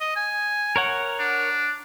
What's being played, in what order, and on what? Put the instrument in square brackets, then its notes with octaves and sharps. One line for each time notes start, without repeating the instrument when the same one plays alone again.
[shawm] D#5
G#5
[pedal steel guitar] A#4 C#5 F#5
[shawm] D4